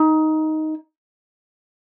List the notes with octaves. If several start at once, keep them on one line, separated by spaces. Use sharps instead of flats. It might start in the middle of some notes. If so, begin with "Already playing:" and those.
Already playing: D#4